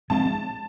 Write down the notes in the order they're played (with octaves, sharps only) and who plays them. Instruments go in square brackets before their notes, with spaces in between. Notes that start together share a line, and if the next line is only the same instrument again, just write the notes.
[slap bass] F3 G#3 C4 [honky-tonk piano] A5